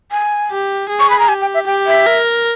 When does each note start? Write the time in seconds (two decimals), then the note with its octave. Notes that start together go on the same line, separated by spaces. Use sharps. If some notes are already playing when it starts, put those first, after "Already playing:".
0.11 G#5
0.51 G4
0.89 G#4
1.00 C#6
1.10 B5
1.19 A#5
1.28 G4 G#5
1.41 G5
1.54 E5
1.67 G4 G5
1.86 E5
2.07 A#4